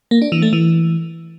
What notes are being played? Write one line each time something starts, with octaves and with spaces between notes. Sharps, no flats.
A#3
D4
E3
A3
E3